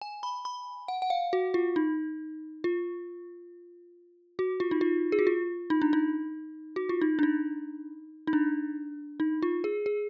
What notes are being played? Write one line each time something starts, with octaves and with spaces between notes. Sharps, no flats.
G#5
B5
B5
F#5
F#5
F5
F#4
F4
D#4
F4
F#4
F4
D#4
F4
G#4
F#4
F4
D#4
D4
D#4
F#4
F4
D#4
D4
D#4
D#4
D4
D#4
F4
G#4
G#4